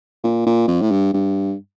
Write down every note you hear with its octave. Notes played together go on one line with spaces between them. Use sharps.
A#2
A#2
F2
A2
G2
G2